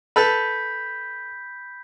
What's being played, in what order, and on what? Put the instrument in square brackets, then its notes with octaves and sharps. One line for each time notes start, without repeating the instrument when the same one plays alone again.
[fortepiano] A4 B4 [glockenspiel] B5 G6 B6